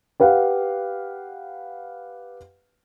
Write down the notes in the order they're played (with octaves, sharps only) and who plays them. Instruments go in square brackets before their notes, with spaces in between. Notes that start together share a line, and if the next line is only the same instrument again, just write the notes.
[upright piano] G4 B4 F5 F#5